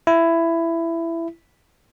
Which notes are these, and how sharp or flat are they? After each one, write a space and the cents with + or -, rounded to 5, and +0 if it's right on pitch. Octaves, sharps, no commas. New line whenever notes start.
E4 +15